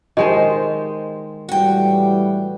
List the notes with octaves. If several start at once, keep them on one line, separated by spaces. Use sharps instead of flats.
D#3 G#3 D#4 G4 C5 D#5
A2 E3 G3 F#4 G5